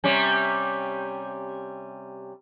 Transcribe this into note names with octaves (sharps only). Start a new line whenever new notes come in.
C3 G3 C#4